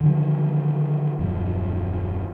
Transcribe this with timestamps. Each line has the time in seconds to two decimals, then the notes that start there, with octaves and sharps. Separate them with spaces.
0.01 D3 D#3 F3 F#3
1.19 D#1 F#2 F3